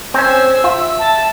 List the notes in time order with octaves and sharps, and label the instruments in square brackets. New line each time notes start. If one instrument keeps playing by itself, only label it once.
[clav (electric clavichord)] C4 C#4 [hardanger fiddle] C5 G#5 [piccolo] E6
[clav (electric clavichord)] F4 [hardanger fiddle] E5
[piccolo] A5